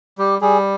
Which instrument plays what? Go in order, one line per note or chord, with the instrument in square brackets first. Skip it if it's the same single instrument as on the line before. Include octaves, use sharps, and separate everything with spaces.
[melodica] G3 G4
G3 G#4